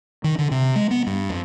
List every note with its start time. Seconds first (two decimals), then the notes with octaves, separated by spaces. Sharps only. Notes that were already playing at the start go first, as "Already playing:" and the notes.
0.24 D#3
0.39 D3
0.51 C3
0.76 G#3
0.91 B3
1.07 G2
1.30 F2